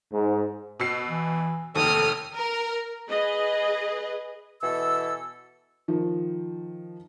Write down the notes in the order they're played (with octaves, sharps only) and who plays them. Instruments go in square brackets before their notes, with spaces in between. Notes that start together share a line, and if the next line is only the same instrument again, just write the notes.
[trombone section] G#2
[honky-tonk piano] B2 E6 C7
[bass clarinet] E3
[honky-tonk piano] F1 D#2 [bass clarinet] A4 [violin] D#6 F6
[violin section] A#4
[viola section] G#4 B4 D#5
[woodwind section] B2 E3 A4 E6
[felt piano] D#3 F3